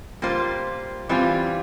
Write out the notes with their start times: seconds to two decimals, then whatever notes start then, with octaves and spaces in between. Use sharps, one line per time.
0.22 G3 A#3 F4 C5
1.09 E3 G3 C4 F4